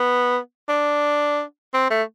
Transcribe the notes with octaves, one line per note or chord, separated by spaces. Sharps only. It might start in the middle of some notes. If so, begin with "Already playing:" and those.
Already playing: B3
D4
C4
A3